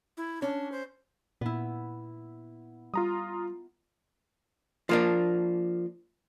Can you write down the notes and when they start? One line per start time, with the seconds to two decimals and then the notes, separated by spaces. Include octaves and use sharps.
0.17 E4
0.42 C#4 D4
0.72 C5
1.41 A#2 B3 E4
2.94 G3 F4 A#5 D#6
4.89 F3 A#3 D4